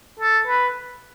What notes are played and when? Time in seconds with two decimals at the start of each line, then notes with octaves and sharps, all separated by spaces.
0.20 A4
0.47 B4